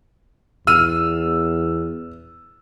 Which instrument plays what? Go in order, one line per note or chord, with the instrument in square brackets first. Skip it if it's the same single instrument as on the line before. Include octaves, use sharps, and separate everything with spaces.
[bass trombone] E2 [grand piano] E6 F6 D#7